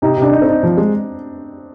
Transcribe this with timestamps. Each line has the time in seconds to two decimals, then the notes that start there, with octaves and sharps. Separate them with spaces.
0.02 C3 D#4
0.17 C3 D4
0.32 D#4
0.42 C4
0.47 D#4
0.63 F3
0.77 G#3